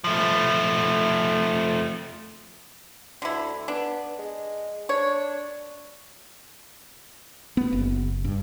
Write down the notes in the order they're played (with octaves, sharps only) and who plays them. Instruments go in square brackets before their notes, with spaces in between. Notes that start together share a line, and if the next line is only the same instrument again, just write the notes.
[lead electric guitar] F3 A3
[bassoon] D2 [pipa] D3 E4
[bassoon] B3 [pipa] D4
[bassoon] G#3
[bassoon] D4 [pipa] C#5
[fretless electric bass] B3
F#1
G2